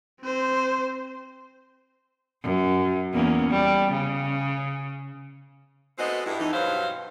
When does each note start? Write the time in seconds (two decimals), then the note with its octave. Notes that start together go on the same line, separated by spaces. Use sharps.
0.21 C4 C5
2.43 F#2
3.14 E2 A#3 C#4
3.49 G3
3.91 C#3
5.98 G#3 A3 B3 C4 F#4 D#5
6.26 G2 G3 G#3 E4
6.39 F2 E3 D#4
6.53 G2 B2 F#3 B4 C5 F5